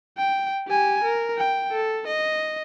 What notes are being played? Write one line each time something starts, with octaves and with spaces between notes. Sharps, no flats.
G5
G4 G#5
A#4
G5
A4
D#5